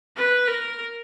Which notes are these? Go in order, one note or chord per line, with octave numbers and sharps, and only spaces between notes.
B4
A#4